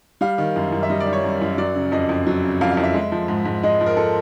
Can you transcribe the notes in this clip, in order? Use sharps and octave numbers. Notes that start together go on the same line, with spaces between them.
G3 F5
D#3
F#2
F#2
E5
G3 D#5
D5
D#3
C#5
F#2
F#2
F#3 D5
C#3
F2 D#5
F2
F#3
C#3
F2 F5
F5
F2
E5
G#3
F3
G#2
G#2
G#3 D#5
F3
A#4
A4